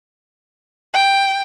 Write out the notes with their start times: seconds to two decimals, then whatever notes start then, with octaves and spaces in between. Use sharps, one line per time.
0.94 G5